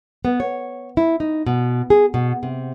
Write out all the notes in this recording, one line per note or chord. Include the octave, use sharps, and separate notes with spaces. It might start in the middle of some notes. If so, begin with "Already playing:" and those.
B3
C#5
E4
D#4
B2
G#4
B2
C3